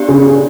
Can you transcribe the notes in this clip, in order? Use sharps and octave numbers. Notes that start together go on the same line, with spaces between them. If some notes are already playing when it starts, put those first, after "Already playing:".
Already playing: B3 D4 G4 D5
C#3